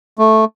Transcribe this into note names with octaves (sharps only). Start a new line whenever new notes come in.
A3